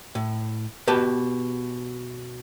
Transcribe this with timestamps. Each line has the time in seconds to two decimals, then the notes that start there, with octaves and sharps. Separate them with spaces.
0.15 A2
0.87 B2 G4 B4 A5